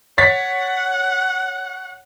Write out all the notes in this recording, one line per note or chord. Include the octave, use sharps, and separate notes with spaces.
C#5 F#5 A6 B6